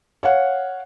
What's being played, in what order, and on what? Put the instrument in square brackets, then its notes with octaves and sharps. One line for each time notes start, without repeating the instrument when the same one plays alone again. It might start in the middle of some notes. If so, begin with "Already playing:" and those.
[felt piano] C#5 F5 F#5